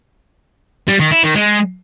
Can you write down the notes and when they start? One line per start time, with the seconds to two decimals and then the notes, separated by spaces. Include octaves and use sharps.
0.88 G3
1.00 D#3
1.12 E4
1.24 D#3
1.36 G#3